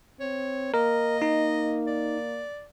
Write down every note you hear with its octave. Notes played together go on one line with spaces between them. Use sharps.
C4 C#5
A#3 A#4 D#5
D#4
D5